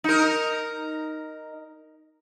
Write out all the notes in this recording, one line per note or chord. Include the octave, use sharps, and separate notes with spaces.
D#4 A#4